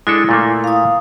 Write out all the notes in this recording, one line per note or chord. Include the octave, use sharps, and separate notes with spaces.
G#3 D4 E4 A4
A#2 A3 A#3
F5 D#6